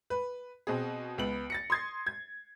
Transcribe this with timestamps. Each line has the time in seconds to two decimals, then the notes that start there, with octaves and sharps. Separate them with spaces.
0.10 B4
0.67 B2 C4 G#4
1.18 C#2 B3 F#7
1.50 A6 A#6 C#7
1.70 C6 D#6 G#6 A6 C7
2.06 G#6